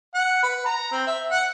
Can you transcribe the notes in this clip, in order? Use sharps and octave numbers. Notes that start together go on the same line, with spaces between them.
F#5
B4
A#5
C4
E5
F#5